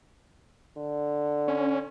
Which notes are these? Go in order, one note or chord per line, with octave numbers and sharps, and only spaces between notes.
D3
C#4